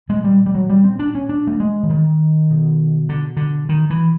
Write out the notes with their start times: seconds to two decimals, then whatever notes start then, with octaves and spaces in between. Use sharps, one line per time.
0.09 A#2 G#3
0.24 G3
0.46 G3
0.55 F#3
0.70 G3
0.84 C4
0.99 D4
1.15 C#4
1.29 D4
1.47 A3
1.60 G#3
1.83 E3
1.89 D#3
2.50 B2
3.09 D3
3.37 D3
3.69 D#3
3.90 E3